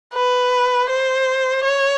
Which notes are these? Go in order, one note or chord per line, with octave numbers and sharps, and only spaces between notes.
B4
C5
C#5